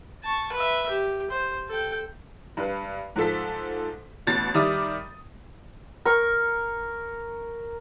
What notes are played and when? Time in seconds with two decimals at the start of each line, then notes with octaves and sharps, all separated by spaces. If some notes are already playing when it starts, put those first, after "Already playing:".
0.24 A5 C#6
0.53 B4 E5
0.90 G4
1.31 C5
1.69 A4 G5
2.57 G2 B4
3.16 G#2 F3 A4 B6
4.27 A1 B2 A6
4.54 D#3 G3 E5 D6 D#6
6.05 A#4 C#6